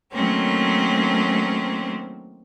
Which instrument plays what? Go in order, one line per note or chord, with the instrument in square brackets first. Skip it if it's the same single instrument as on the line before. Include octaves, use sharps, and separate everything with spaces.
[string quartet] D#3 F#3 A3 A#3 C4 C#4